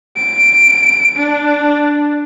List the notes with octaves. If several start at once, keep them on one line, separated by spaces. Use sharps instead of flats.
D7
D4